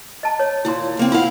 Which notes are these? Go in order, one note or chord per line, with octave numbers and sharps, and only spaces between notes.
D#5 A5 A#5
C#5
D#2 A#2 E4 C6
C#3 A#3 C4
E4 F4 F5 F#5